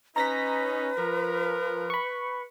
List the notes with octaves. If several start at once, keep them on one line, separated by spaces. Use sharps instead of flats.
C#4 D#4 B4 A#5 A#6 B6
F3 A#4
B5 C#6